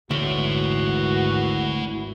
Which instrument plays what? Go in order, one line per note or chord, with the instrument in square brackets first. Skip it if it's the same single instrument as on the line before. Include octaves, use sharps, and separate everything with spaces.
[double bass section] G#1 E3 [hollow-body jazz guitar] D2 [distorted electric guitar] E4 C#5 [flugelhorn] F#4